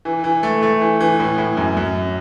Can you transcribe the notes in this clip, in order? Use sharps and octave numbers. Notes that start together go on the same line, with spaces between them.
E3
E3
A3
A3
E3
E3
A2
A2
F#2
F#2